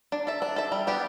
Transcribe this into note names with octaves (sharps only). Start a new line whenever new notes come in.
D4
A4 E5
D4
A4 E5
G3
B3 D4 G4